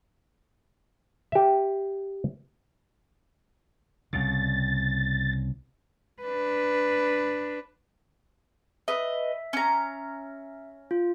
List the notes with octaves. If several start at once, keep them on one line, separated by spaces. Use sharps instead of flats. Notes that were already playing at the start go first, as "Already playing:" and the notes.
G4 E5
C2 C#3 A6
D4 B4
B4 D#5 E5
C#4 A#5
F4